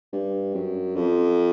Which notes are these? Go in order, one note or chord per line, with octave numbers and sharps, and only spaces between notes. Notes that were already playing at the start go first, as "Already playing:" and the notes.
G2
F#2
F2